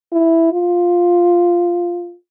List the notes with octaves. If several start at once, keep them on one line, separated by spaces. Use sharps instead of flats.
E4
F4